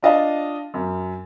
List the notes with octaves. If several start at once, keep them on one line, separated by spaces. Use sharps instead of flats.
D4 F4 D#5 F5 A5
F#2